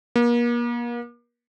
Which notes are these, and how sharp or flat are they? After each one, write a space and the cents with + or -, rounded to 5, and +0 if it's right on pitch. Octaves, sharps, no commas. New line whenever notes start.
A#3 +40